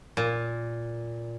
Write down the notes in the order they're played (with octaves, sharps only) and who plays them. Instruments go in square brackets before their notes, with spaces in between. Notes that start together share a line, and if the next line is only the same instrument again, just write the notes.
[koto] A#2